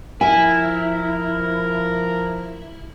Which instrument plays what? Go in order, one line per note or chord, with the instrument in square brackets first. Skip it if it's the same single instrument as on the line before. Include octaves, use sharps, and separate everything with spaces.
[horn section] F3 A#4 [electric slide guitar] E4 [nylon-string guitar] G#5